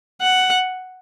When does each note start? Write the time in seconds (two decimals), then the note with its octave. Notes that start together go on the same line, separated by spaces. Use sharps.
0.21 F#5